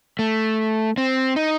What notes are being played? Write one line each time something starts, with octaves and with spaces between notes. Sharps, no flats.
A3
C4
D#4